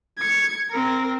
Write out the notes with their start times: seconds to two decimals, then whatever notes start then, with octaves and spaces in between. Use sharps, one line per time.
0.18 G#6 C#7
0.70 C4 A#4